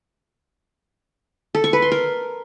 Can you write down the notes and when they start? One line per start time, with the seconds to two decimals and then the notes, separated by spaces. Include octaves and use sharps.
1.55 A4
1.64 C#6
1.73 B4
1.82 C6
1.92 A#4